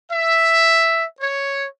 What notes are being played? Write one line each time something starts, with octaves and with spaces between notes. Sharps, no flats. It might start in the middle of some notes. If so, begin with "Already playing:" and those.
E5
C#5